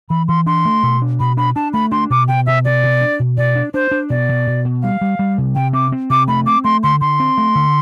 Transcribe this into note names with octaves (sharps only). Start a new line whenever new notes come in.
E3 B5
E3 C6
D4 C6
A3
B2
D4
B2 B5
D4 B5
D4 A5
A3 B5
D4 C6
B2 D6
B2 G5
B2 E5
B2 D5
B2
D4
B2
B2 D5
D4
D4 C5
D4
B2 D5
B2
B2
B2
G3 F5
G3
G3
C3
C3 G5
C4 D6
C4
C3 D6
A3 B5
C4 D6
A3 C6
D3 C6
D3 C6
C4
A3
D3